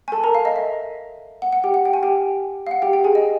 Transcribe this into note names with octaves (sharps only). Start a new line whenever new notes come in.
G#5
A4 A5
A#4 A#5
F5
D#5
E5
F#5
F#5
G4 G5
F#5
G5
G#5
G4 G5
F5
F#5
G4 G5
G4 G5
G#4 G#5
D#5